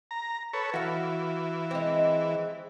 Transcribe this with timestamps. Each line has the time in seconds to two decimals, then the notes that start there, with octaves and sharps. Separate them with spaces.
0.11 A#5
0.53 A4 B4 C#5
0.73 E3 F#4 F5
1.71 G#3 C4